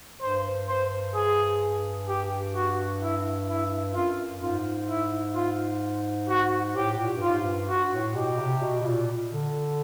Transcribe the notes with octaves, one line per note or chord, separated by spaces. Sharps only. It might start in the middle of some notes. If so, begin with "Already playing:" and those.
G2 C5
C5
G#4
G4
F#4
E4
E4
F#2 F4
G#2 F4
E4
F4
F#4
A2 G4
A#2
G2
G#2 F4
G2
F#4
A2
B2 G4
C3
B2
B2
A#2
D3